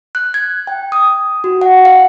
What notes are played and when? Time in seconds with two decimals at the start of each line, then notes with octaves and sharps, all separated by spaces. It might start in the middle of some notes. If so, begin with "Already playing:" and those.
0.15 F#6
0.34 G#6
0.67 G5
0.92 D#6
1.44 F#4
1.61 F#5
1.85 F5